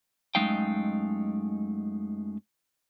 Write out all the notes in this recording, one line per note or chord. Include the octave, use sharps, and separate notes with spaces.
F#2 G#3 A3 D#4 F5 G5